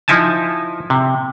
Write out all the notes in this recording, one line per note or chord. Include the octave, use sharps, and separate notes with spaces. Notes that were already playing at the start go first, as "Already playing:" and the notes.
F3 D#4 E4 G#5 A5
C3